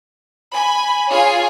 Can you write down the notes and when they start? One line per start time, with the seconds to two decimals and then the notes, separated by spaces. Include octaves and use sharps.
0.53 G#5 B5
1.10 F4 G#4 C#5 G#5 C7